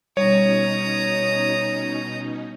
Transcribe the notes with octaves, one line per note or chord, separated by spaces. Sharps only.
B2 G3 C#4 D#4 C#5 A#5 D#6